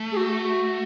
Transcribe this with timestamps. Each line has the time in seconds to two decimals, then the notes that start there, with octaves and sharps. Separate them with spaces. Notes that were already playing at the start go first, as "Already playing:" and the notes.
Already playing: A3
0.12 G#4
0.17 F#4